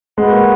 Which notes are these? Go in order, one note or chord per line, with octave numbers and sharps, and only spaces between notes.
G#3 F#4 B4 F#5
A#3